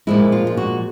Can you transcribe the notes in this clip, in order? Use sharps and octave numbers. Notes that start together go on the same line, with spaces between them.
A#2 F3 G#3 E4
F4
F4
F#4